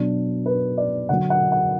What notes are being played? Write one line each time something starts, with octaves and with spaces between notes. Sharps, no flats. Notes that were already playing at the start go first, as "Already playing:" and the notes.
Already playing: B2 F#3 D4
B4
D5
D3 F#3 F#5
F#5
F#5